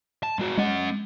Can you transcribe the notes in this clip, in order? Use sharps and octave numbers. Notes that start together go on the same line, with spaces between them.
A5
G#3 F#4
G#3 C#4 F#5